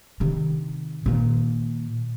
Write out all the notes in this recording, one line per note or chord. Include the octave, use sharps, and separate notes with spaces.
C3 D#3
A#2 D#3